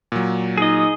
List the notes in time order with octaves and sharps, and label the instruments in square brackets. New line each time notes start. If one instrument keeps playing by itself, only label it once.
[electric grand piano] A#2 F#3
[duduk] D#4 [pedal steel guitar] G#4 D#5